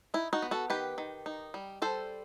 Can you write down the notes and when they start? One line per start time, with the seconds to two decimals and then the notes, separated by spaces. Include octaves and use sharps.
0.14 D#4 E4
0.33 D#4 F#4
0.42 B3
0.51 F#4 A4
0.70 D#3 G4 B4
0.98 D#3
1.26 D#4
1.54 G3
1.82 G3 A4 C5